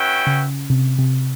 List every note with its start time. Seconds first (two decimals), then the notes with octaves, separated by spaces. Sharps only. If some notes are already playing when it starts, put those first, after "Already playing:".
Already playing: C#4 F#4 B4 E5 G5
0.27 C#3
0.70 C3
0.98 C3